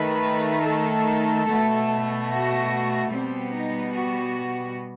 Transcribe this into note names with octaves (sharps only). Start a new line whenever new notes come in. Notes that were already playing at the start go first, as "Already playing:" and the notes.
Already playing: D#3 A3 B4
A4
B2 A3
F#4
B2 G3 B3 C4
D#4
F#4